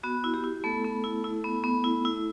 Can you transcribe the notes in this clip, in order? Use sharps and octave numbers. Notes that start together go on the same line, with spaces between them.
B3 F#4
E4
G4
E4
A3 B3 A4
B3
E4
E4
B3
B3
E4
E4